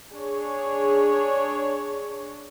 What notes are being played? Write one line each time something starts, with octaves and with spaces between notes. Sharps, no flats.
D4 G#4 C#5